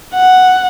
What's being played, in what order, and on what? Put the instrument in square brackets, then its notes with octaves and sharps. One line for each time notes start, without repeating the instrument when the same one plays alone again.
[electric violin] F#5